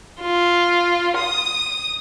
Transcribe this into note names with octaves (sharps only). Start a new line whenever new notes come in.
F4
D#6